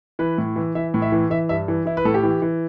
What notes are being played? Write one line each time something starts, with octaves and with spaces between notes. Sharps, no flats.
E3 B4
A2
E3
E3 E5
A2
E5
E3
E3 E5
G2 E5
E3
E3 E4
B4
A2 A4
G4
E3
E3